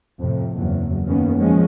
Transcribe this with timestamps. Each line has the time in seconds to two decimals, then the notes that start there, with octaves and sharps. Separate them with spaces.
0.19 F2 A2 C3
0.54 F#1 E2 F#3
1.06 F#2 D#3 F#3 A#3 B3 C#4
1.37 F3 G#3 C#4